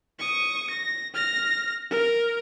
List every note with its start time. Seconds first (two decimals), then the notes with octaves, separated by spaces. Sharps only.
0.19 C#6 D#6
0.70 A#6
1.14 F6 A#6
1.91 A#4